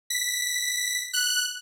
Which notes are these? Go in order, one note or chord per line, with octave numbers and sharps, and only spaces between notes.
B6
F#6